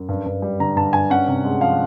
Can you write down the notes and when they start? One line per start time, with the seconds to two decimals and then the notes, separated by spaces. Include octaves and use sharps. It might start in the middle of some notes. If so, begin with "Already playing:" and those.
Already playing: F#2
0.09 G2
0.26 G2
0.42 G3
0.60 D3 A#5
0.76 G2 A5
0.93 G2 G#5
1.10 C#4 F#5
1.28 C3
1.44 G#3
1.61 F3 F5